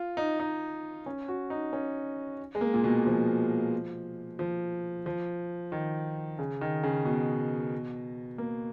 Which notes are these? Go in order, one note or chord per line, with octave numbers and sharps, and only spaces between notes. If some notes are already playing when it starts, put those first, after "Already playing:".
Already playing: F4
D#4
D#4
C#4
F#4
D#4
C#4
G#3
A#3
A#2
B2
F3
F3
F3
D#3
C#3
D#3
C#3
B2
A#3